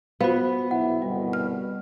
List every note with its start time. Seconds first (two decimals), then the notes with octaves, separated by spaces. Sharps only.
0.21 B3 F4 F#4 C5 F5
0.71 B1 E4 F#5
1.02 G1 C2 B2 G3
1.33 F6